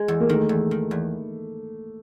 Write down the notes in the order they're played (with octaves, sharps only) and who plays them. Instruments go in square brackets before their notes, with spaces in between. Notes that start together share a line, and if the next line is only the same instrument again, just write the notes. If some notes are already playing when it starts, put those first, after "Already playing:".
Already playing: [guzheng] G#3
E2
[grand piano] A#3
[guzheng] D#3 [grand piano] A3
[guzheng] E2
D#3
E2